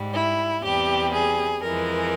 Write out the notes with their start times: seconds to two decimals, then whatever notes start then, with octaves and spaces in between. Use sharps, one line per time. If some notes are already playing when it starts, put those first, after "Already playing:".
Already playing: G#2 G3
0.14 E4
0.63 E2 C3 G3 G4
1.13 G#4
1.63 F2 E3 G#3 A#4